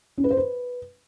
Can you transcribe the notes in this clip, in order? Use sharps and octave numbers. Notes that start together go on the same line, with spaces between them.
C#4
B4
C5
B4